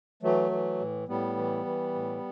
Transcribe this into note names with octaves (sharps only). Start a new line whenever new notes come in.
E3 F#3 A3
E3
A2
A2 G3 B3
E3
E3
A2